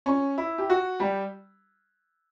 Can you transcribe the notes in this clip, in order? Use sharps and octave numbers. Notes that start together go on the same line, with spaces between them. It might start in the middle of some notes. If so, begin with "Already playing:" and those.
C#4 C#5
E4
G4
F#4
G3 G4